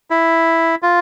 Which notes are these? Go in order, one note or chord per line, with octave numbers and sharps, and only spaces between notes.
E4
F4